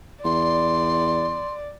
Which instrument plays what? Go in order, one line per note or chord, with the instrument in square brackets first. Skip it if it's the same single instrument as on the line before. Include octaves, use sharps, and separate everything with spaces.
[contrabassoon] E2 [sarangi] D5 [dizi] C6